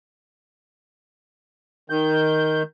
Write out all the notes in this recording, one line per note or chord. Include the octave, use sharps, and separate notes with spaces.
D#3 G6